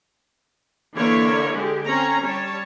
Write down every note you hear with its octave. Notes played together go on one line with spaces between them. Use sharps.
D3 E3 A#3 C#5 D5 E5
D3 G#3 G4
C4 C#4 C#5 A#5
G3 C#5 A5